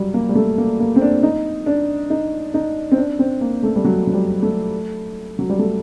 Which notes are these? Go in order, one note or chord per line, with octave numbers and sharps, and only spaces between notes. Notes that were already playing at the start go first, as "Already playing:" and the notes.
Already playing: F#3 G3
A#3
G3
A3
A#3
A#3
C4
D4
D#4
D4
D#4
D#4
C4
D4
C4
A#3
A3
G3
F#3
F#3
G3
A3
F#3
G3
A3